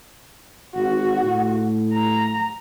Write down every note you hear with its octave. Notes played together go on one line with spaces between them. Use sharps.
G#1 F#4
A2
A#5